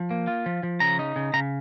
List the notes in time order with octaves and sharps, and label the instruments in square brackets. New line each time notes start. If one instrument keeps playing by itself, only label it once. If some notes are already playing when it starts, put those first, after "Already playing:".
Already playing: [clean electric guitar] F3
A#3
F4
F3
F3
C#3 A#5
D#4
C#3
C#3 A#5